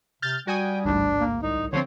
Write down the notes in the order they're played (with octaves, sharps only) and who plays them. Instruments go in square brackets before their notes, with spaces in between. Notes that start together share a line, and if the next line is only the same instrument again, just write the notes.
[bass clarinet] C3 [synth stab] F6 G6 A6
[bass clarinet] G3 [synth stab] F#4 G#5 D#6 [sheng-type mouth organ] G5
[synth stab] A1 D2 G#2 [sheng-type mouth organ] D4
[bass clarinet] A#3
[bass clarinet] C2 [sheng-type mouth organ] D#4
[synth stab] D3 F3 C4 [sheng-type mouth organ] C5 C#5